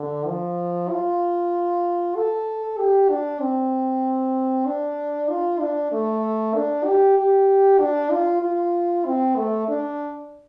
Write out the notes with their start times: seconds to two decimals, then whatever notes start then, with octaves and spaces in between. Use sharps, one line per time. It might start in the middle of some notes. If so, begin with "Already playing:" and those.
Already playing: D3
0.27 F3
0.90 F4
2.16 A4
2.78 G4
3.10 D4
3.40 C4
4.66 D4
5.30 F4
5.60 D4
5.92 A3
6.55 D4
6.85 G4
7.18 G4
7.79 D4
8.11 F4
8.42 F4
9.06 C4
9.36 A3
9.68 D4